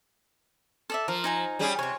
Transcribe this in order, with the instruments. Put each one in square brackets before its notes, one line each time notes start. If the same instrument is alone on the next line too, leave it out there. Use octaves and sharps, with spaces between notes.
[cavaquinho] A4 D5 E5
[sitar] F3 [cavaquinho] A#4
[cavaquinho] D#4 G#5 A#5
[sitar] G3 C#4 G#4
[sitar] C3 [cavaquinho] C#5 C#6